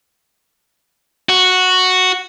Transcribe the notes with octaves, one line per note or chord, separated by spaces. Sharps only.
F#4